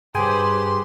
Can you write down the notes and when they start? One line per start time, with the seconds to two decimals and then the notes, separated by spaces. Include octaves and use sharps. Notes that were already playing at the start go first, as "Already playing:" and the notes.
0.15 G2 G4 G#4 B4 C5 G5 G#5 C6